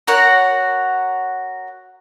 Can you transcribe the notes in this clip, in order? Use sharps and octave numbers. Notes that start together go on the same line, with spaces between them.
F#4 A#4 C#5 F#5